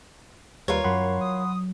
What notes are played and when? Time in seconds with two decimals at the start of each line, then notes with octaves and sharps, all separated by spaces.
0.68 D#2 G3 F4 A#4 B4 C#5
0.84 F#2 F#3 F#5 B5 C6
1.21 D#6